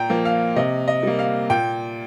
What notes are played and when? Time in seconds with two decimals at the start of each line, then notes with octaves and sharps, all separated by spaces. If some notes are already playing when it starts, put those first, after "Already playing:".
Already playing: A#2 G5 A#5
0.10 F3 A#3
0.25 F5
0.56 C3 D#5
0.88 D#5
1.03 G3 A#3
1.19 F5
1.50 A#2 G5